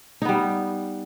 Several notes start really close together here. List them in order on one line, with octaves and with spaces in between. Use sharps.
D#4 B3 G3